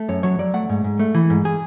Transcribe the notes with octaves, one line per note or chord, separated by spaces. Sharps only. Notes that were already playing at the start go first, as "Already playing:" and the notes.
Already playing: A3
F#2 C#5
F#3 C#5
F#3 D5
A3 F#5
G#2
G#2
A3
E3
G#2
G#4